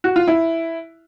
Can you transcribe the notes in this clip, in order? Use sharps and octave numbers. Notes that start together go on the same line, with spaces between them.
F#4
F4
E4